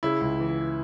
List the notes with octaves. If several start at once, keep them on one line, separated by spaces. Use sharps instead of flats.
C#3 E4
C#2
E3